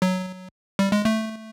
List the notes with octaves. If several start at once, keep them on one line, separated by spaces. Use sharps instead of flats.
F#3
G3
G#3
A3